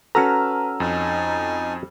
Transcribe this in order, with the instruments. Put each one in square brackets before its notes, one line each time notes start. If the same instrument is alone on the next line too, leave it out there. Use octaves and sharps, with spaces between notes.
[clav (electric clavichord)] C#4 F#4 A4 [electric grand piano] B4 E6 F6 [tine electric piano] A#5
[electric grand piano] F2 [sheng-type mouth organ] D#4 G#5 A5